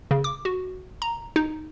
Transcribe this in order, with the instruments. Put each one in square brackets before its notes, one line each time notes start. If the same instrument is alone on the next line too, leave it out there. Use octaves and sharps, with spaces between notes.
[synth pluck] C#3
D6
F#4
A#5
D#4